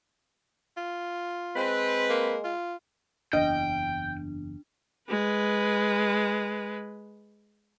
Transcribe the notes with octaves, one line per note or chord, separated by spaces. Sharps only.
F4
G#3 C4 B4
A#3
F4
F#1 E2 D4 D#5 G5
G#3 B4